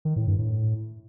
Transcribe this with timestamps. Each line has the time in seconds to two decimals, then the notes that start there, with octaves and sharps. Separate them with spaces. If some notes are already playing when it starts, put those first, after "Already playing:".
0.05 D#3
0.16 A2
0.27 G2
0.39 A2